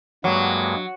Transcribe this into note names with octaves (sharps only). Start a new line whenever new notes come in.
G2 F#3 G#3 A#3